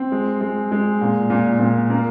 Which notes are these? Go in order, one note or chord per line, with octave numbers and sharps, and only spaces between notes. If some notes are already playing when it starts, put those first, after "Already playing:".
Already playing: C4
G#3
G#3
G#3
A#2
A#2
A#2
A#3